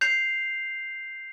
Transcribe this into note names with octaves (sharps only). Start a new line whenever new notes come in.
G6 C7 F7